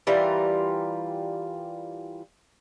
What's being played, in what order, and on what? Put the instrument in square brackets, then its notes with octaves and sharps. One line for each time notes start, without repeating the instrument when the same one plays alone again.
[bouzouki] E3 G3 F4 A#4